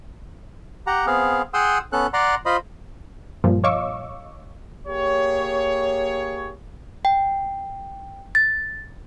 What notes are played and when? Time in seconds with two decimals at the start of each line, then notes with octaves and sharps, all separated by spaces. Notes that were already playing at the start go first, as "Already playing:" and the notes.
0.87 G4 F#5 A#5
1.07 B3 C4 G#4 F5
1.54 G#4 F#5 G5 C6 D#6 E6
1.93 B3 C#4 A4 F#6
2.13 D5 F#5 A#5 C6
2.46 F4 C5 D#5 B5
3.44 G2 A#2 F3
3.64 C#5 D#5 F5 C#6 D6 E6
4.87 A#3 G4 G#4 C#5
7.05 G5
8.35 A6